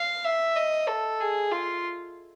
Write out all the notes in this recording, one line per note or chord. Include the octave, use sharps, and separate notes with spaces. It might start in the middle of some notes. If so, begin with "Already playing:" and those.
Already playing: F5
E5
D#5
A4
G#4
F4